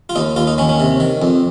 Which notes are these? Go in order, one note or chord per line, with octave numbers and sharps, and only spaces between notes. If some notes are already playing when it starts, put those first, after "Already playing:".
F4
D#2 D#4
D#2 F4
D#4
D#3 C#4
C#4
C3
D#3
F2